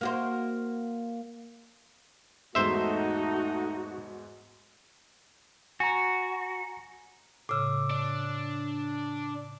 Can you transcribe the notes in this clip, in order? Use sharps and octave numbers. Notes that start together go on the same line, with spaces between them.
A#3 F#4 C5
E2 G#2 A3 D#4 F#4 C5 E5
F#4 G#5 A#5
A2 C#3 D6 E6
D4